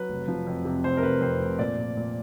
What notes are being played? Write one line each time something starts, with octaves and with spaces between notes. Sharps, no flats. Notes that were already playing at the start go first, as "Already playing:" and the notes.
Already playing: F#3 B4
F1
F3
F2
C3
F1 C5
A#4
F1 B4
F2 C5
F1
A#2 D5
A#2
A#2